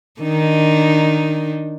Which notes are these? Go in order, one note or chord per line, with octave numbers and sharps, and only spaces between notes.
D#3 D4 D#4